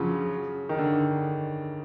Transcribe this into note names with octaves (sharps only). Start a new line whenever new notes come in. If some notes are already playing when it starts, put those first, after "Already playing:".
Already playing: C#3 F3 F#3
D#3
D3